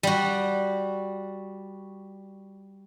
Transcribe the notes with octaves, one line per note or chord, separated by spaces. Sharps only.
G3 F#4